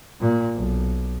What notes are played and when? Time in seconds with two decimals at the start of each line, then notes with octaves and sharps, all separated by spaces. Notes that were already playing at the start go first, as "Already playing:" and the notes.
0.21 A#2
0.55 B1